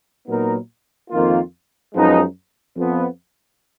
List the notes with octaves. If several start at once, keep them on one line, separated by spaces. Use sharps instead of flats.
A#2 F#3 B3 D#4 A#4
F2 D#3 A#3 F4
F#2 F3 G#3 B3 D#4
F2 F3 B3